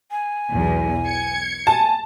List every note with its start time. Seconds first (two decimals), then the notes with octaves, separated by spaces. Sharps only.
0.11 G#5
0.50 B1 E2
1.07 G#6 C#7
1.67 G#5 A5